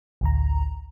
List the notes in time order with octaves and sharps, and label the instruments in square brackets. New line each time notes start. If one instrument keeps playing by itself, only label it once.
[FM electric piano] A1 D2 A#5